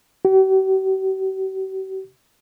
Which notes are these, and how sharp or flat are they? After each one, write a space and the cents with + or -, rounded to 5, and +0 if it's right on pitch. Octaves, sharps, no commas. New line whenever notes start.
G4 -45